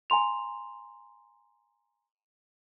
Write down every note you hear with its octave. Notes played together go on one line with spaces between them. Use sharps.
G#5 A#5 C6 F7